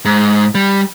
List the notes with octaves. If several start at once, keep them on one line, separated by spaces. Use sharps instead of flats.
G#2
G3